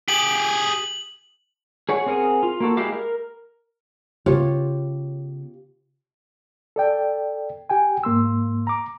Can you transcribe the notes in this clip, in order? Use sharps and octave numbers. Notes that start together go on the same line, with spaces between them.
G4 G#4 F#7
G#4 C#5 F#5
C4 G#4 A#4 F#5 G#5
F4
A#3 F#4 A4
G#3 E4 G4 F5 D6
A#4
C#3 B3 F4 G4 C#5
A4 D5 G5
G4 G5 G#5
G#2 A#3 C6 E6
A#5 D6